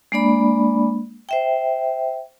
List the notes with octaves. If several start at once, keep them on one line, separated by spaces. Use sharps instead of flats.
G#3 A#3 D4 D5 B5
C5 E5 G5